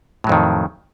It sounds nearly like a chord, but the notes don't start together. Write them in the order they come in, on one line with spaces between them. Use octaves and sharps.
A2 F#3 F2 D#3